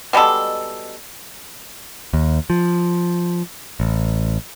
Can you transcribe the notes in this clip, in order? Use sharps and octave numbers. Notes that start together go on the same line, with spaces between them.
B2 G3 G#3 A4
D#2
F3
A1